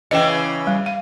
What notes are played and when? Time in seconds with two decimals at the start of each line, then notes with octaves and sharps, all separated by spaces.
0.11 C#3 E3 D#5 G5
0.67 G3
0.86 F5